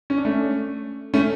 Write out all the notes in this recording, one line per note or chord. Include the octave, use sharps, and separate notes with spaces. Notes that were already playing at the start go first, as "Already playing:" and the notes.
C#4
D4
A3 C#4
A3 C#4